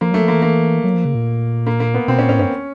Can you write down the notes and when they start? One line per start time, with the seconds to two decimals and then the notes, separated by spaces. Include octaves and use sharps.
0.01 F3 A#3
0.11 F#3 A3
0.22 F3
0.28 E3 A#3
0.42 A#3
0.84 F#3
0.94 F3
1.05 C#3
1.15 A#2
1.67 A#3
1.80 A#3
1.94 B3
2.08 B2 C4
2.19 A#2 C#4
2.29 A2 C#4
2.39 G2 C#4